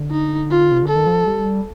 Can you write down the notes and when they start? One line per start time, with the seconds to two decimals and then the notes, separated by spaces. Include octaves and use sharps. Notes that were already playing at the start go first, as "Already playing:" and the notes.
Already playing: D3
0.11 D#4
0.50 F4
0.71 C3
0.83 D3
0.88 A4
0.95 D#3
1.07 F3
1.26 G3